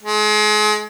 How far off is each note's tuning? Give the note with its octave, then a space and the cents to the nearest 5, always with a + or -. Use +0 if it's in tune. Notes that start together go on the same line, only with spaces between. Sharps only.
G#3 +35